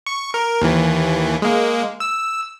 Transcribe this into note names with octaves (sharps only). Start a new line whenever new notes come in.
C#6
A#4
D#2 E3
G#3 A#3
E6